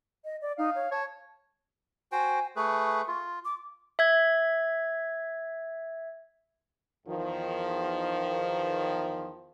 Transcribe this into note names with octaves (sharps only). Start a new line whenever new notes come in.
D#5
D5
D#4 F5
C#5
C#5 A5
F#4 C5 G5 G#5
A3 G#4 B4 C#6
F4
D6
E5 G#6
E2 D#3 F3